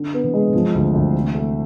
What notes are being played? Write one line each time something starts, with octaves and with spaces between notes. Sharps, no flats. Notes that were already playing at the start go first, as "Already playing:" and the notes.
Already playing: D3
B3
C3 E3
G#3
C3 E3 F3
D2
D2
A3
A3